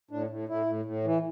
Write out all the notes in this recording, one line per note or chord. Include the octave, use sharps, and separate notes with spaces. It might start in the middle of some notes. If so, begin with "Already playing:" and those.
A2 D4
A2
A2 E4
A2
A2
E3